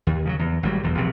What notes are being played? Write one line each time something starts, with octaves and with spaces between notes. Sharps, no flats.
D#2
C#3 F3 F#3
E2
G#1 F#3 G3
E1 E2
A#1 C3